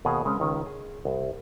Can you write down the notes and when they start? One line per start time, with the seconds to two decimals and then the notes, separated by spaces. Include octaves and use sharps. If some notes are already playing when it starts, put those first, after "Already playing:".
0.05 D#2 B2 F#4 G#4
0.25 C#3 G#3 C4 C#4
0.40 C#2 D#3 C#4
0.66 G#4
1.05 C2